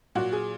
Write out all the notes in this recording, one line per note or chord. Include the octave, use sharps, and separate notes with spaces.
A#2 F#3 F#4
G#4